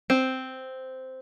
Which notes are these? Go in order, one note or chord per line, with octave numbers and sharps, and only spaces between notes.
C4